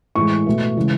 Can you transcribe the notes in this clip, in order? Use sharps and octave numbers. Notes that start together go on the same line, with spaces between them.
A2 E3 G#3 C#6
B2 A3
C#3 E3 G#3